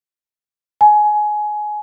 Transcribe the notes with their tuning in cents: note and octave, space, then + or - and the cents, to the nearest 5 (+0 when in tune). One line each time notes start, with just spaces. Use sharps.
G#5 +20